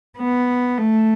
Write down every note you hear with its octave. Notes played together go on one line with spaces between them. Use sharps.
B3
A3